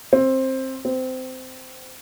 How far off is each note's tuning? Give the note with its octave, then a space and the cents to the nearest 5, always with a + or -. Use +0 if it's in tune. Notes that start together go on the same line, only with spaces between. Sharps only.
C4 +15
C4 -20